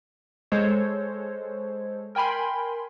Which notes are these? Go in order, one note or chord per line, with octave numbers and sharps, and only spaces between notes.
G#3 A4 C5 C#5
A#4 G5 G#5 B5 C6